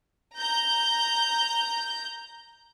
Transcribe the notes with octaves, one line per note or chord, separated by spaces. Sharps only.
A#5 G6